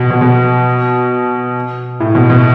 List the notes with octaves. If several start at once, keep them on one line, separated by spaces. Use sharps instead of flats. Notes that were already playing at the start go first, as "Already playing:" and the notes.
Already playing: B2
B2
B2
A2
B2
B2